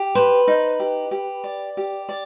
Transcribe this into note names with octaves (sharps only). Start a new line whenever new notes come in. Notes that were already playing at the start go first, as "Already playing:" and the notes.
Already playing: G4
B4 C5
D#4
G4
G4
D5
G4
D5